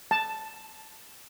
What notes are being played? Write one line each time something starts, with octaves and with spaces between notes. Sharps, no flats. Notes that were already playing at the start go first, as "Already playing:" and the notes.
A5